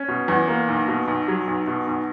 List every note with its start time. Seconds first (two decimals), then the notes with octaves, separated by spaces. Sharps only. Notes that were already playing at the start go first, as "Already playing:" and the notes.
Already playing: C#4
0.08 B2
0.28 E2
0.48 A#3
0.68 B1
0.88 B2
1.08 B1
1.28 F#3
1.47 B1
1.67 B2
1.87 B1